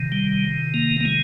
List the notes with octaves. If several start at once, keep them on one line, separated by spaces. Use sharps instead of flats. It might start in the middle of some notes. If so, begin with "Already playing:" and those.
Already playing: C3 D#3
G3
A#3
A#3
G#3